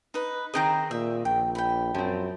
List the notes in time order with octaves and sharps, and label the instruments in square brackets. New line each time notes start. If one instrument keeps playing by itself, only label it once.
[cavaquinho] D#4 B4
[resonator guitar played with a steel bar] D#3 C4 G#4 [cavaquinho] D#5 G5 A#5
[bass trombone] A#2 [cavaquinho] E5
[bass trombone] A#1 [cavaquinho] G5
[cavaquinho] G5 B5
[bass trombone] F#2 [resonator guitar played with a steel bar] F3 C4